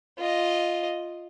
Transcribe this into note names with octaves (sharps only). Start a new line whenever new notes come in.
F4 D#5